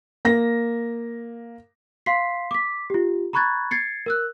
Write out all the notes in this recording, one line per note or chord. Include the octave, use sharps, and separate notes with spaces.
A#3 A#6
F5 C6 B6 C7
D6 B6
F4 G4
A#5 B5 C#6 F#6 G#6 A6
G#6 A6 C7 C#7
A#4 E6 F#6